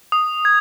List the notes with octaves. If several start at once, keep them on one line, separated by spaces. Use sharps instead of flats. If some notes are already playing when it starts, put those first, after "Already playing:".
D#6
G#6